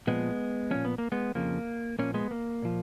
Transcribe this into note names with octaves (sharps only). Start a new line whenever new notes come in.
A#2 F3 G#3 B3
A#2 F3 C#4
B3
A#3
G#3 B3
F2 C#3 F3 A#3
A#2 F3 A#3 C#4
G#3 B3
A#3
A#2 F3